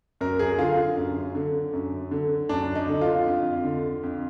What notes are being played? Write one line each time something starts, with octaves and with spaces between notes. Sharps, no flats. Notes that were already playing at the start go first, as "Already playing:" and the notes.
F#2 A#4
G#4
D3 F4
F#2
D3
F#2
D3
F#2 D4
D#4
D3
F4
F2
D3
F2